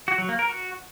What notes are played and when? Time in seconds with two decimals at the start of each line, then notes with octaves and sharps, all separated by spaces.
0.08 F#4
0.18 F#3
0.29 A#3
0.39 A#4
0.49 F#4